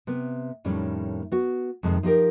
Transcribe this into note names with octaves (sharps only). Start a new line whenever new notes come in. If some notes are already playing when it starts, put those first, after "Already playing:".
C3 B3
F2 A2 D#3 G3 C#4
B3 F#4
F2 C3 D#3 G#3
F3 D#4 G4 A#4